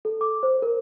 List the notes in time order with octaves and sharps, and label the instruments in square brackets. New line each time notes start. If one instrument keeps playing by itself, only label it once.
[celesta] A4
D6
C5
A#4